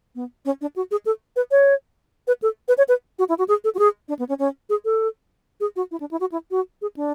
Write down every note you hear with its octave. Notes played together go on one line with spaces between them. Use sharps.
B3
C#4
D4
F#4
G#4
A4
B4
C#5
B4
A4
B4
C#5
B4
F#4
E4
F#4
G#4
A4
F#4
G#4
D4
B3
C#4
C#4
G#4
A4
G#4
F#4
E4
D4
E4
F#4
E4
F#4
G#4
D4